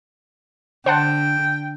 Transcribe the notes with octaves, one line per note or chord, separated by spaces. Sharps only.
D3 C5 F#5 G5 A5